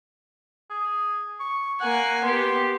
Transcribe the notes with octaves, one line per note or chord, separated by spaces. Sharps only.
G#4
C#6
A#3 F#5 G#5
B3 G4 C6